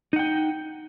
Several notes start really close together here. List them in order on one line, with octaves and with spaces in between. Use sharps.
D#4 F#5 G5